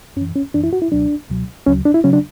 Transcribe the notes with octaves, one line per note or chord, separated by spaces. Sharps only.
F#2 E3 C#4
C#4
F#2 E3 D4
E4
F#4
E4
C#2 B2 F#3 D4
C#2 B2 F#3
D2 C#3 F#3 C#4
D4
E4
C#3 F#3 C#4
D4